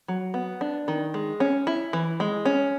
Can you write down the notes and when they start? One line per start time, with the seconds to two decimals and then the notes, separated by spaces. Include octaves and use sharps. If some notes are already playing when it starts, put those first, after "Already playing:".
0.08 F#3
0.34 B3
0.61 D4
0.88 D#3
1.14 G#3
1.40 C#4
1.67 E4
1.93 E3
2.20 G#3
2.45 C#4